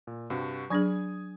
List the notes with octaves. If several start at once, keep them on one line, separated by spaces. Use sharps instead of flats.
A#2
G2 C3 F#4
F#3 D4 G#4 G#5 D#6 G#6